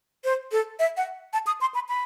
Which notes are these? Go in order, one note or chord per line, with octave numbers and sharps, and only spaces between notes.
C5
A4
E5
F#5
A5
D#6
C6
B5
B5